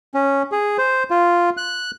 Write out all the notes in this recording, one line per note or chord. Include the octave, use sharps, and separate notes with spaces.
C#4
G#4
C5
F4
F#6